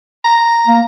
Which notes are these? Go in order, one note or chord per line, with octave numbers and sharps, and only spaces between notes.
A#5
A#3